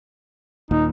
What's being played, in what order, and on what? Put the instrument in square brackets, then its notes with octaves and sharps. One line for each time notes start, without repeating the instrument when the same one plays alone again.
[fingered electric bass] D#1 D#2 A#2 [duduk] D#4